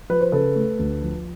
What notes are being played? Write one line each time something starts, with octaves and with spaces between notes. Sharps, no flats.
F3 B4
C5
C#3 A4 B4
A3
D2
F3